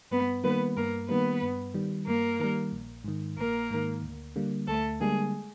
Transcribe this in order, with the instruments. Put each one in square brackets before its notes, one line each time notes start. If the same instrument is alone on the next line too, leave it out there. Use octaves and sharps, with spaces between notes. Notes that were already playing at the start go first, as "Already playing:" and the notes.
[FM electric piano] G2 [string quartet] B3 B4
[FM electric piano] D#3 G3 A#3 [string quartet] B3 B4
[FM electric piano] G2 [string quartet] A#3 A#4
[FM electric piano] D#3 G3 A#3 [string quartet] B3 B4
[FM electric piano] G2
D#3 G3
[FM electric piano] G2 [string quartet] A#3 A#4
[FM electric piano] D#3 G3
A#1
G#2 D#3
[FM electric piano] A#1 [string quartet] A#3 A#4
[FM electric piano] G#2 D#3
D2
D3 G3 A#3
[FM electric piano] D2 [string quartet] A3 A4
[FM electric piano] D3 G3 A#3 [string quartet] G#3 G#4